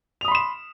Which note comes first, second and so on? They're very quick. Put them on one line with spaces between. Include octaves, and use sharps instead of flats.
F7 D#6 B5 C6 E7